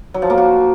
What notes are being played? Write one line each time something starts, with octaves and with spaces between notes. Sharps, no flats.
F#3
F3
A#3
F#4